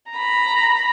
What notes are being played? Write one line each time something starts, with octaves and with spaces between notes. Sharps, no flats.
A#5 B5